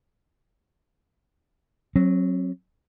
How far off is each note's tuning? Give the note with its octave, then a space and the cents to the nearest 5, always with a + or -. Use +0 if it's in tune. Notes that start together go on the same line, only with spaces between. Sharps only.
F#3 +0 C4 +40